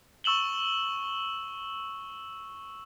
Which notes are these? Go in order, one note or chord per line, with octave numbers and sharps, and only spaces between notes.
C#6 E6 E7 F#7 G7